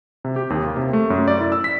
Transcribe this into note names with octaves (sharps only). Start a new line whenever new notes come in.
C3
G4
D#2
A#3
C3
A3
F#2
D5
E4
E6
B6